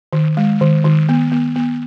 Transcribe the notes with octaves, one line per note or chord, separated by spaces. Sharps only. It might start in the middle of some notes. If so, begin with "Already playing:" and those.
D#3
G#3
D#3
D#3
B3
B3
B3